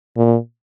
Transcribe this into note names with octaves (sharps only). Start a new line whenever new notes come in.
A#2